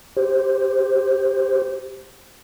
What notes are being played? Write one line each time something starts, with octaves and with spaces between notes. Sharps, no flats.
G4 C5